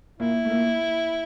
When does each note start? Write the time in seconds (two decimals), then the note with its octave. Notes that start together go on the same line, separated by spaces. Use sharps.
0.19 A#2 A#3 E4
0.45 A3
0.50 A#2 A#3